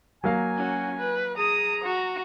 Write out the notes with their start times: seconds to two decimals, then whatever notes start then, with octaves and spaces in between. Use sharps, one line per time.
0.24 F#3 A#3 F5 G#5
0.56 C#4 F#4
0.98 B4
1.38 G#4 A#5 D#6
1.84 F#4